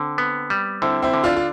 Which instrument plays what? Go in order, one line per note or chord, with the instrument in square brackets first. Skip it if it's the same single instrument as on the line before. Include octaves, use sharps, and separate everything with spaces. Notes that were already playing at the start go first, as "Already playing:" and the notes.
Already playing: [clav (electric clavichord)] D3 [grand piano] C4
[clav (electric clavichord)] B3
G3
[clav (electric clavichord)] D3 [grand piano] C4 E4
[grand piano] C4 E4
[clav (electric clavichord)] D3
[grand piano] D4 F4
F4